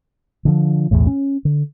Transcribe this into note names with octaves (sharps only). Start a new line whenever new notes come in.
D3 E3 F3
B1 E2 A2
C#4
D3